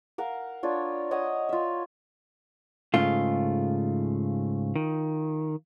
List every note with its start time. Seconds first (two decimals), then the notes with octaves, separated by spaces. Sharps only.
0.18 A#4 F5 F#5
0.63 D4 F4 C#5
1.11 C#5 D#5 F#5 D#6
1.49 F4 E5
2.94 G#2 C#3 A3 F4
4.76 D#3